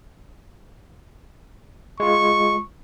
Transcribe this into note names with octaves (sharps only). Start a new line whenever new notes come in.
G#3 F4 C#6